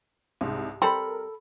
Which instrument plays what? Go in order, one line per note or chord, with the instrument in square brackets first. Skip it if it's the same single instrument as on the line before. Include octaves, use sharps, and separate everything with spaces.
[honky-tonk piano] C2 G#2
[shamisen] G3 C4 [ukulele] A4 B5 [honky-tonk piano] A#4